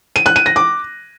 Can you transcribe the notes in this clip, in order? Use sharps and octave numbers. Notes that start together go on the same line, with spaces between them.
D#7
F#6
D#7
A#6
D6